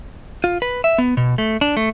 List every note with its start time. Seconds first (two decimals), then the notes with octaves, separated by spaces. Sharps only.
0.44 F4
0.62 B4
0.84 E5
0.98 B3
1.17 B2
1.38 A3
1.61 D4
1.77 A3